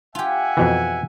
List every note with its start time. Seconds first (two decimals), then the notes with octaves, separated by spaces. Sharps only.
0.15 F4 G4 E5 F#5 G#5
0.57 F2 B2 E3